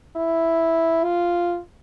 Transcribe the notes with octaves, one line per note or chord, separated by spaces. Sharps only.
E4
F4